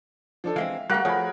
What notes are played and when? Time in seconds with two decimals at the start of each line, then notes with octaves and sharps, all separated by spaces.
0.44 F3 D4 A4
0.56 E3 G#3 C4 E5 F5
0.90 G3 A3 F#4 G4 A#4 F5 F#5 F#6
1.05 F3 A3 G#4 C#5 B5